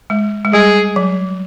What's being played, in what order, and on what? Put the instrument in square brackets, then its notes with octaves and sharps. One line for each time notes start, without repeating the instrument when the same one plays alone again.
[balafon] G#3
G#3
[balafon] G3 [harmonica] G#4
[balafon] F#3